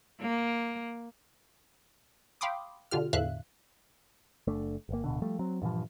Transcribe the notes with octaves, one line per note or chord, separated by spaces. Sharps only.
A#3
F5 G5 B5 C6 D6 D#6
B2 D3 F4 G4 F6
E2 A2 D3 E5 F5 F#6
F#1 A3 D4
G1 A#3
D1 B2 D3
F3 G3 A3
F#3 C4
G2 A#2 E3 F3